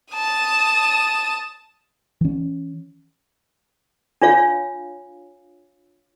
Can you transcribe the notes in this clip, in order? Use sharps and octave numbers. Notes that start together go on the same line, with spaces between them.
A5 D#6
E3 C#4
D4 F4 C#5 F5